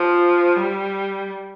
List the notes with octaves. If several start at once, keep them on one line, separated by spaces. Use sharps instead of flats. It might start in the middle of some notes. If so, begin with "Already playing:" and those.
Already playing: F3
G3